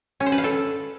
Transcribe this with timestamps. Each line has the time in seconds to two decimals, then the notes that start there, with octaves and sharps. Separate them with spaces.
0.20 C#4
0.26 C5
0.32 B4
0.38 F5
0.44 A4